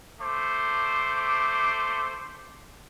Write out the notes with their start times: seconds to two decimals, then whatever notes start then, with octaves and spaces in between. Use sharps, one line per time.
0.20 A3 C5 D6